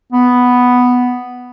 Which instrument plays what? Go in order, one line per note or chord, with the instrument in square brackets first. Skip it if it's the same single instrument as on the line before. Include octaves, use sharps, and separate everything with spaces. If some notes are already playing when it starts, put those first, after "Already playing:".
[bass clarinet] B3